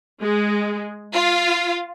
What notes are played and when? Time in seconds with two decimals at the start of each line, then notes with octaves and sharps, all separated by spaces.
0.21 G#3
1.13 F4